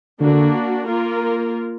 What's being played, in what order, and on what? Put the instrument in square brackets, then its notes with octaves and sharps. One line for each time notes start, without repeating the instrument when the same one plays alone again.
[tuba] D3 [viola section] A#3 D4 F#4
[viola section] A#3 F4 A#4